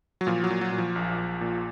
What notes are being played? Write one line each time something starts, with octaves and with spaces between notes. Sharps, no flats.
F#3
A#2 F3
F#3
A#2
F#3
A#2
F3
A#1
A#1
A#2